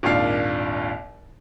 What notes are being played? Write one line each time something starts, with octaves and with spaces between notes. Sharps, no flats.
G#1 D#2 A#2 D4 F5